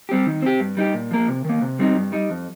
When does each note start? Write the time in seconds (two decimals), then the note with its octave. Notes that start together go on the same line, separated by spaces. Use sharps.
0.09 G3 C4 G4
0.26 D#3
0.42 C4 G4
0.60 G2
0.77 G3 D#4 G4
0.94 A#2
1.11 F3 A#3
1.28 C3
1.45 D#3 A#3
1.61 C3
1.79 G3 C4 D#4
1.96 G2
2.12 G3 D#4
2.30 F2